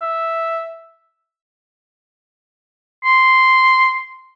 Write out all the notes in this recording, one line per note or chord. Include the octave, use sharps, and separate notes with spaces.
E5
C6